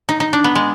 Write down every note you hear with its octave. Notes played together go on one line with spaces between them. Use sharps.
D#4
D#4
D4
B3
G#3